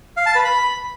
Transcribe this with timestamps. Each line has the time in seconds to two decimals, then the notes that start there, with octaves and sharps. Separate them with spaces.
0.17 F5
0.26 A5
0.35 B4
0.44 B5